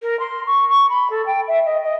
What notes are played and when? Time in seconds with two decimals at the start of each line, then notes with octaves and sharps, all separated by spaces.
0.02 A#4
0.19 C6
0.47 C#6
0.68 C#6
0.89 B5
1.10 A4
1.26 G5
1.47 E5
1.65 D#5
1.84 D#5